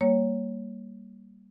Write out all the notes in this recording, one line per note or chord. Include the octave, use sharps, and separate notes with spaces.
G3 A#3 C#5